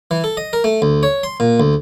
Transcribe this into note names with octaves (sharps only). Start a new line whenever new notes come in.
E3
A4
D#5
A#4
A3
D2
C#5
C6
A#2
D2